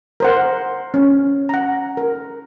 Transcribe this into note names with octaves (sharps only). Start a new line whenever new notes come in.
A#4 C5 F#5
C#4
F#5 A#5
A#4